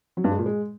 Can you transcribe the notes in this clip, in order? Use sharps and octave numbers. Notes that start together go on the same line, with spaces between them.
F#3
G2
G#3
A#2
G#3